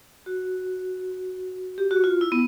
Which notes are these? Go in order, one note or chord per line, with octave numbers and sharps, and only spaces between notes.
F#4
G4
F#4
F4
E4
B3